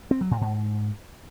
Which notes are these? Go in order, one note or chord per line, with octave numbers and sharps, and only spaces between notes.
C4
F#3
A2
G#2